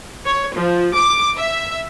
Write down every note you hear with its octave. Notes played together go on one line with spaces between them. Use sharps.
C#5
F3
D6
E5